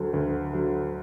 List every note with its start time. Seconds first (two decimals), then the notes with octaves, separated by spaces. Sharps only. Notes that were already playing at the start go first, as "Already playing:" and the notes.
Already playing: D2 D3 F#3
0.14 D2
0.53 D3 F#3